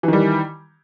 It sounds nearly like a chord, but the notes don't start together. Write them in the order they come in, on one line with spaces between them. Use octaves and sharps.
E3 D#3 G3